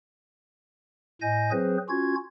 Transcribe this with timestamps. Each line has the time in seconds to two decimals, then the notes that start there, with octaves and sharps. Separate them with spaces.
1.21 A2 D#5 G#5 G6 A#6
1.51 F#3 C4 G#4 B4 C5
1.89 C#4 F4 F#4 G#6